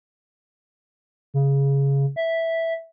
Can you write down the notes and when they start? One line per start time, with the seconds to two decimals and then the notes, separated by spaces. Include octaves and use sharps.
1.34 C#3
2.16 E5